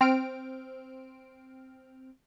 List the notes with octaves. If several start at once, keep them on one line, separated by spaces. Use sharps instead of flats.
C4 F6 D7